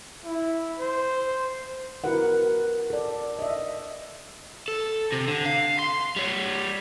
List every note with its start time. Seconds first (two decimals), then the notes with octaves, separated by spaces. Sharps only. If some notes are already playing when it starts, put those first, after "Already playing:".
0.24 E4
0.79 C5
2.04 E4 F#4 A#4 B4 F#5
2.90 A4 D5
3.39 D#5 E5
4.68 A4
5.12 C3
5.28 D3
5.45 F5
5.79 C6
6.16 G3 C#5